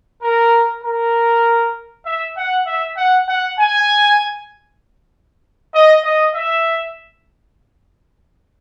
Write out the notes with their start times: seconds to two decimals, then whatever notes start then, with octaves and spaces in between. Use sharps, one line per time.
0.22 A#4
0.83 A#4
2.05 E5
2.36 F#5
2.66 E5
2.97 F#5
3.28 F#5
3.59 G#5
5.74 D#5
6.04 D#5
6.34 E5